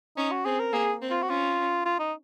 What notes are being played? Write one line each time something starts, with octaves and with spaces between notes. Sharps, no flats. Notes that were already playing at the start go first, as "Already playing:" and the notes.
C#4 D#4
F#4
C4 G#4
A#4
A#3 G#4
C4
F4
F#4
C#4 F4
F4
D#4